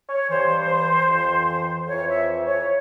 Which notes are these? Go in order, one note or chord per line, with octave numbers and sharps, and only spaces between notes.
C#5
G2 E3 C5
F2 E3
F2 E3 C#5
E5
C#5